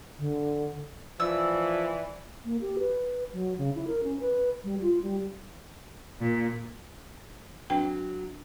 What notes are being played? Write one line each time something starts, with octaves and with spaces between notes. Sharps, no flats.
D3
E3 F3 D5 E6
A#3
G4
B4
F#3
C#3
E4
A#4
C#4
B4
G3
F4
G3
A#2
F#3 C4 D4 B4 G5